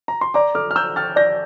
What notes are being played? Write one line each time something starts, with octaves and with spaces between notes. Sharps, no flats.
A#5
C6
D5 A#5 D6
A4 D6 F6
F6
A#5 E6 G6
G5 F6 A6
D5 G6 A#6